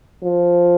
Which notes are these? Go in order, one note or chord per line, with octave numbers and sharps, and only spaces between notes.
F3